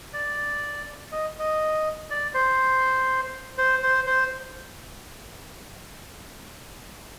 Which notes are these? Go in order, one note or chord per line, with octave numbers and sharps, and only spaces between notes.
D5
D#5
D#5
D5
C5
C5
C5
C5